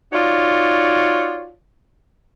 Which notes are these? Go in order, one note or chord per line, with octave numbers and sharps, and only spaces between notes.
D#4 F4 F#4 C#5 D5